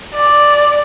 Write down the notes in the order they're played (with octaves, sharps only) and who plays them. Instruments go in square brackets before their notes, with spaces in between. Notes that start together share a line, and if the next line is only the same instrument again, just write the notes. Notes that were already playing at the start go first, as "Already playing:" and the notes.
[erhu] D5